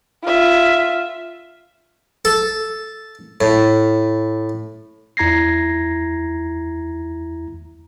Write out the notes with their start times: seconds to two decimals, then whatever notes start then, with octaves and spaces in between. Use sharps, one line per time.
0.24 F4 E5
2.25 A4
3.41 A2
5.17 E2 E4 A#5 G#6 A#6 C7